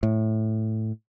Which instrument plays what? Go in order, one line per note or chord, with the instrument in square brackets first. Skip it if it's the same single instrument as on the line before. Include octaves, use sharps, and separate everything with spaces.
[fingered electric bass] A2